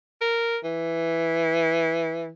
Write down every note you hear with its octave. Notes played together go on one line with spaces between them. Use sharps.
A#4
E3